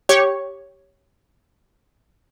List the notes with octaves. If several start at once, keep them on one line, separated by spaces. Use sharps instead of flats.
G4 C#5 C#6